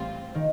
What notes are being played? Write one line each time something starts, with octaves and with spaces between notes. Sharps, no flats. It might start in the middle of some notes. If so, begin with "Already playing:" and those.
Already playing: A1 A2 G3 C4 F4
D#3